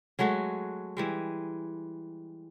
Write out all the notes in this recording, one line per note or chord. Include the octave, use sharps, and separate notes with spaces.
F#3 G#3 A3 F#4
E3 G3 G#3